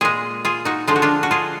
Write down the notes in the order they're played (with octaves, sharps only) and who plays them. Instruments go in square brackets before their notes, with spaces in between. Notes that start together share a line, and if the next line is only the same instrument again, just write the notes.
[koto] A#2 G#3 F4 G#4
F4 G#4
D#4 F#4
D3 F3 G#3 F4
F#4
D4 F4
F#4
F4 G#4